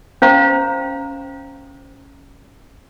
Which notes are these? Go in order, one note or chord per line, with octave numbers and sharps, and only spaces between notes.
C#4 C5 F5 A#5